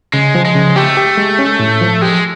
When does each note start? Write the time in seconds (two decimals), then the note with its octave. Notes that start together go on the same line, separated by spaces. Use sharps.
0.13 C#3 G#3
0.35 F3
0.45 G#3
0.55 C#3
0.76 A3 G4
0.97 G4
1.18 G#3
1.39 C#4
1.60 A2
1.81 F3
2.01 G#3 G4